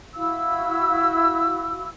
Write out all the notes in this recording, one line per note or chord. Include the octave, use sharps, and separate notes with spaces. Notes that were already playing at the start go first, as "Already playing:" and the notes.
E4 F#4 F5 E6